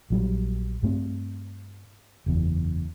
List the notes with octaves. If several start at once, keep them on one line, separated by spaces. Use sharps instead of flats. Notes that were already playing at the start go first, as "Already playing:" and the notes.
A#1 F#3 G3
G2 A3 C4
F#1 E2